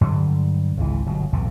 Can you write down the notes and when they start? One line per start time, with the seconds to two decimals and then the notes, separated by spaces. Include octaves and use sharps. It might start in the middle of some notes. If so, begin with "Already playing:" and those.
0.01 G2 D3 F#3 G3
0.77 G#1 C#2 E3 G#3
1.07 G1 B2 F#3
1.33 B1 E2 A2 C3